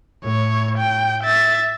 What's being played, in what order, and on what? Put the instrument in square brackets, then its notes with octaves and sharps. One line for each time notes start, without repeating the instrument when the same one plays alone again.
[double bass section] A2 [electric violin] C#5
[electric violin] G5
E5 A6